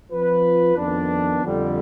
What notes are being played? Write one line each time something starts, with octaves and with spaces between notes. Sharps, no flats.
F3 C4 F4 B4
F2 D#3 B3 D4
F2 D3 G3